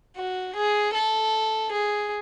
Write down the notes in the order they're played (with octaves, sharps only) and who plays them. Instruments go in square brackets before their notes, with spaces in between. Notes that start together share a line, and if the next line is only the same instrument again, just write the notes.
[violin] F#4
G#4
A4
G#4